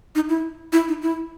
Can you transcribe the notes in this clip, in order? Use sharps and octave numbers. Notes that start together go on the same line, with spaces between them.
D#4
E4
E4
D#4
E4